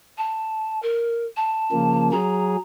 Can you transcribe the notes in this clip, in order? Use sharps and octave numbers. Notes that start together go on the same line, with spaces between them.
A5
A#4
A5
C#3 F3 A#3
F#3 G#4 A#5